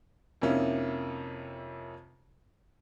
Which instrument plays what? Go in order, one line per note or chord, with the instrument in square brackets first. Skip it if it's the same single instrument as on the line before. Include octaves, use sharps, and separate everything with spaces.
[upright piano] F2 C3 A#3 C#4 D#4 E4